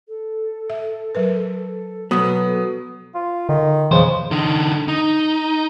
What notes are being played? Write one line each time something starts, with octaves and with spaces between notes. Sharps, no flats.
A4
E5
F#3 A#4 B4
B2 F#3 B3 D#6
F4
D3 D#3
B1 F2 C#3 E3 C5
D3 D#4
D#4